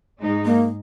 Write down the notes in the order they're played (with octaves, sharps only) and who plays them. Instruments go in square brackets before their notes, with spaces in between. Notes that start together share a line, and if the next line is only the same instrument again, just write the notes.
[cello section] G#2 G#3 D#4
[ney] A#3